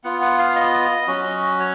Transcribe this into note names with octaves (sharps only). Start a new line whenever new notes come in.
B3 F4 F#5
F#5
F5
D#5
F#3 C#4 F#4
C#5